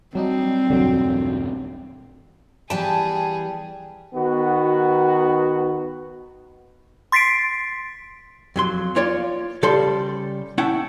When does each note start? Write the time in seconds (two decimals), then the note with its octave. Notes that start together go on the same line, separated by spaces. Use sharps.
0.15 F#3 G3 C4 D4 D#4
0.70 B1 E2 G2 D3 F#3
2.70 E3 G3 B3 G#4 G5 A5
4.14 D#3 B3 F#4
7.12 C6 A6 B6 C7 D7
8.56 F2 F#3 C6
8.95 A#3 F4 C#5 D5
9.63 C#3 G3 A4 C5 D5 C6
10.58 A3 C#4 E4 F#5 G5 A5